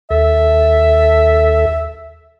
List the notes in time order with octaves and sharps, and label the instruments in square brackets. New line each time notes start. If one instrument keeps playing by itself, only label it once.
[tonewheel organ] D#2 A4 [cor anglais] E5